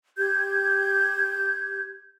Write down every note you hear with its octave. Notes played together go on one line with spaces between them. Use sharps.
G4 G6 G#6